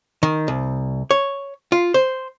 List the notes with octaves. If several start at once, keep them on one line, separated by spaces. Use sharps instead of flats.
D#3
C2
C#5
F4
C5